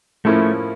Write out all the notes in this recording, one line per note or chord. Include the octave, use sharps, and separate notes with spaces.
A2 F3 A3 A#3 C#4 E4